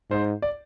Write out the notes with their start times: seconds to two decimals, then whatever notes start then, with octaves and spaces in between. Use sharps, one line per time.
0.10 G#2 C5
0.42 D5